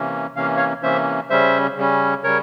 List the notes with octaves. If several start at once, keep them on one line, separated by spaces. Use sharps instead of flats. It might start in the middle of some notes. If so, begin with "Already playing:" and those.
Already playing: C3 E3 A#3 C#4
C3 E3 A#3 C#4 F5
C#5 F5
C3 E3 A#3 C#4 C5 E5
C#3 G3 C#4 C5 E5
C#3 G3 C#4
C#3 G3 A#4 C#5